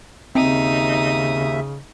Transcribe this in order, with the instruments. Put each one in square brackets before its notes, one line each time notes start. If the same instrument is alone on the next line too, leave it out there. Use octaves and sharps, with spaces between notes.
[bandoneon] D#2 E5 [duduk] C#3 [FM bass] C4 [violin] D#4 D#6